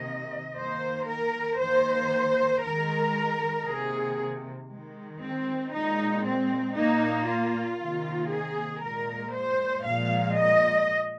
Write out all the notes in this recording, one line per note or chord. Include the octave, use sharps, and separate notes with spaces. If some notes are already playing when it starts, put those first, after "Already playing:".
Already playing: C3 D#3 A#3 D#5
D#3 A#3 C5
A#4
D#3 A#3 C5
D#3 G#3 A#4
C3 D#3 A#3 G#4
D#3 G#3
C4
A#2 G#3 D#4
C4
A#2 A#3 D#4
F4
C3 D#3 A#3
G#4
A#2 G#3 A#4
C5
A#2 F3 G#3 F5
D#5